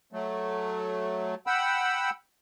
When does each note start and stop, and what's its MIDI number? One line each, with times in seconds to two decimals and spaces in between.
0.13 1.35 54
0.13 1.35 57
1.47 2.10 78
1.47 2.10 79
1.47 2.10 83
1.47 2.10 88